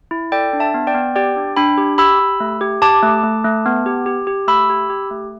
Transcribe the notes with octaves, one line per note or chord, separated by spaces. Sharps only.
E4
A4 D5 G5
D4
E5 A5
B3
D5 G5
B3
G4 D5 G5
D4
D4 G5 B5
G4
G4 B5 E6
G4
A3
G4
G4 A5 D6
A3
A3
A3
B3
G4
G4
G4
A3 B5 E6
G4
G4
A3